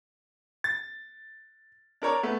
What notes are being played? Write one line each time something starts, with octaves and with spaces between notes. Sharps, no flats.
A6
D4 A#4 C#5 D5
A3 B3